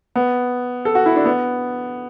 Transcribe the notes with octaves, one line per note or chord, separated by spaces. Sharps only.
B3
A4
F#4
E4
D4
B3